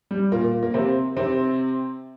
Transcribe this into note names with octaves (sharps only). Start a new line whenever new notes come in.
G3
A#2 A#3
A#3
C3 C4
C3 C4